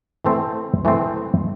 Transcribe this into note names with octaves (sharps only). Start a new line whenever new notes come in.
E3 A3 C4
E3 A3 C4